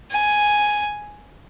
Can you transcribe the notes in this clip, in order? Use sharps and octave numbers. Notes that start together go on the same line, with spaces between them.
G#5